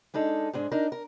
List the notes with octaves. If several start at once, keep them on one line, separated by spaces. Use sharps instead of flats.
G#3 D4 D#4 A4
G#2 G#3 D4
D4 D#4 A#4
A#4